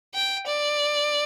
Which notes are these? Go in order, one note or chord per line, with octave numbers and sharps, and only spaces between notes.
G5
D5